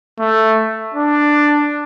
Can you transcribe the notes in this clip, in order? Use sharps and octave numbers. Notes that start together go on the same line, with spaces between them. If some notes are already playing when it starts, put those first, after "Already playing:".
A3
D4